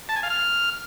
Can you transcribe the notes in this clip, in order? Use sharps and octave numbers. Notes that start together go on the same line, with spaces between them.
A5
G#5
F5
F6